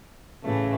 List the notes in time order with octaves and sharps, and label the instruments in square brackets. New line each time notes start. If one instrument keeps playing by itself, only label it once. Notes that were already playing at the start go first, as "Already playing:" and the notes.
[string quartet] A2 E3 A3 [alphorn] C#3